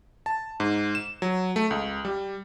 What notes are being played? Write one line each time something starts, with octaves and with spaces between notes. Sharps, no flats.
A5
G#2
E7
F#3
A3
C#2
G3